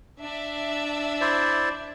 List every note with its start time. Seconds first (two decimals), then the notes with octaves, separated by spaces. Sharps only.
0.21 D4 E5
1.21 E4 C5 D5